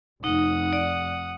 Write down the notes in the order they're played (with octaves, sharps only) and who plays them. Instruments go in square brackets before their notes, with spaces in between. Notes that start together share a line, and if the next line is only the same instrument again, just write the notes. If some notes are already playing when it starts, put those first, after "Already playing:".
[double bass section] F1 [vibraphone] D#4 [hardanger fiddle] F#5 D#6
[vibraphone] D5